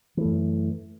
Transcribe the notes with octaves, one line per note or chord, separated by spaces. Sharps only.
F#2 E3 A3